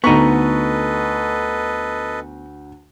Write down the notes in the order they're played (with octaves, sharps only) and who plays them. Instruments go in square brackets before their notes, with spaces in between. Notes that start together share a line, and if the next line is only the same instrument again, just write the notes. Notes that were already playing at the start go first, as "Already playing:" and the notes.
[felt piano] D2 A#5 C#6 [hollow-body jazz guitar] B3 D#4 [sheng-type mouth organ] A4 B4 D#5